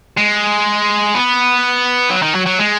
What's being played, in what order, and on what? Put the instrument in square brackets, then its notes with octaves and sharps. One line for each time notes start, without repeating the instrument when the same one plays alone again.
[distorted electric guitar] G#3
B3
F#3
D#3
F#3
F#3
G#3